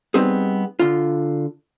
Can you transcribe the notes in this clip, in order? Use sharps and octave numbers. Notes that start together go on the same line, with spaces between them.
G3 B3 C4 D#4 G#4
D3 F4